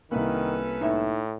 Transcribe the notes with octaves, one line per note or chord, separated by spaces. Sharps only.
C2 D#3 A#3 C#4 A4 B4
A2 D#4 C#5 E5